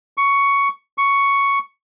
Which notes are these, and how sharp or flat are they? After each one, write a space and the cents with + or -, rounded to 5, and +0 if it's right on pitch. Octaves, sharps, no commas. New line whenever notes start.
C#6 +10
C#6 +5